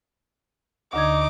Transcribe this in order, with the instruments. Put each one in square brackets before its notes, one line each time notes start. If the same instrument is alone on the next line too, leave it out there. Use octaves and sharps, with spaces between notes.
[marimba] D2 D3 G#6 [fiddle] D#4 [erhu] D6